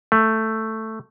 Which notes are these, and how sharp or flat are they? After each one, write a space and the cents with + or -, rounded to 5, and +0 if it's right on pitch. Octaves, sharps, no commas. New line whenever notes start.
A3 +5